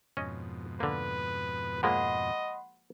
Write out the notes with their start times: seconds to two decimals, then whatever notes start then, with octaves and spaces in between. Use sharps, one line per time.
0.17 F2 G#2 B2 C#4 D#5
0.80 D3 A#3 B4
1.83 F3 G#3 A#3 D#5 F#5 B5 C6